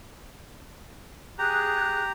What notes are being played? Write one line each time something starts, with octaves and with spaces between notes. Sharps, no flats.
G4 G#4 A#5 F#6